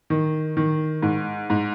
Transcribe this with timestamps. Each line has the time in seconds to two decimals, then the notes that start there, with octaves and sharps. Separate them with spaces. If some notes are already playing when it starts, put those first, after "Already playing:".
0.10 D#3
0.57 D#3
1.03 G#2
1.50 G#2